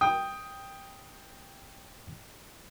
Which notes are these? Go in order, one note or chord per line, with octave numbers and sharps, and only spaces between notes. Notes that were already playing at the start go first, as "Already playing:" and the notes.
G5 D#6